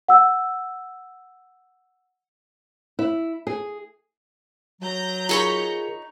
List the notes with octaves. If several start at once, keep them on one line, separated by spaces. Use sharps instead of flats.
F#5 E6
E4
G#4
F#3 A#5 G6 A#6
D#4 F4 G#4 A#4 C#5 B5